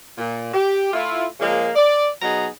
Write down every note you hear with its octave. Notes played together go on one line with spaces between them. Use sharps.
A#2
G4
A3 E4 F4
C#3 F3 G#3 A#3
D5
B2 F#3 B3 D#4 G#4 A#5